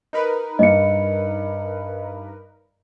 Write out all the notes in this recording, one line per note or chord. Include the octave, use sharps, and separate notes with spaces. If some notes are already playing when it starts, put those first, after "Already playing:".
D#4 A#4 B4
G2 D#5 C#7